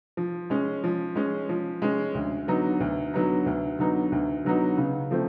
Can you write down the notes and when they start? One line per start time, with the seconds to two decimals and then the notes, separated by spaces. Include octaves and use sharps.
0.17 F3
0.50 G#3 C#4
0.84 F3
1.15 G#3 C#4
1.49 F3
1.82 G#3 C#4
2.15 D2
2.47 D3 F#3 B3 D#4
2.80 D2
3.13 D3 F#3 B3 D#4
3.46 D2
3.79 D3 F#3 B3 D#4
4.12 D2
4.45 D3 F#3 B3 D#4
4.77 C#3
5.11 F3 A3 C4